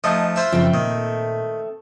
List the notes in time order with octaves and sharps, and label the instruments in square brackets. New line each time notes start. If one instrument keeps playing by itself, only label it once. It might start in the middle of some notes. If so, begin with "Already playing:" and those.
[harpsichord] F3 A3 D#4 [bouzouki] G#4 D#5
[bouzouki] E4 [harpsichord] F4 C5 E5
[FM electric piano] F#2 C#3 F3 [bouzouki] A3 C4
[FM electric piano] A#2 [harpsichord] D#3